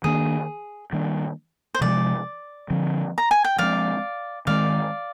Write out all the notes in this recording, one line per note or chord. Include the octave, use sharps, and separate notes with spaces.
D#3 A#3 D4 G#4
D#3 G3 A#3 D4
C5
C3 F3 G#3 D5
D3 F3 C4
A#5
G#5
G5
F3 G#3 C4 D5 F5
D#3 G#3 C4 D5 F5